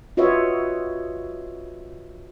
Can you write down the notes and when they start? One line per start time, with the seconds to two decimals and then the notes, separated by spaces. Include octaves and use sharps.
0.17 F4 F#4 B4 C#5 D#5 E5